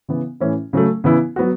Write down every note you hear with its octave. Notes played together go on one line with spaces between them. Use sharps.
C#3 E3 B3
A2 E3 C#4 E4
C#3 F#3 A3
C#3 E3 B3 E4
F#3 B3 F#4